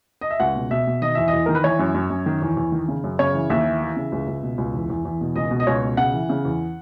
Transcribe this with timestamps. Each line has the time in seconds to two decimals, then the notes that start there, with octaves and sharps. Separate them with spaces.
0.21 D#5
0.31 E5
0.40 C#2 F#5
0.56 B2
0.71 B2 E5
0.87 B2
1.02 D#3 D#5
1.15 E2 E5
1.28 D#5
1.33 E2
1.46 D#3 A#4
1.55 B4
1.64 E3 C#5
1.79 F#2
1.94 F#2
2.10 F#2
2.26 D#3
2.42 E2
2.57 E2
2.72 D#3
2.88 C#3
3.04 F#2
3.19 C#3 C#5
3.34 E3
3.50 D#2 E5
3.65 E3
3.81 E3
3.97 C#3
4.12 C#2
4.28 C#2
4.43 B2
4.58 C#2
4.74 E2
4.90 E2
5.05 E2
5.21 B2
5.36 C#2 D#5
5.51 B2
5.60 D#5
5.67 C#2 C#5
5.83 B2
5.97 C#3 F#5
6.14 E3
6.29 C#3
6.45 E2